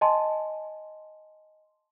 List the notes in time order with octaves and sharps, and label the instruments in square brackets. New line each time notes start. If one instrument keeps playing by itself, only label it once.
[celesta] D#5 G#5 A5 C6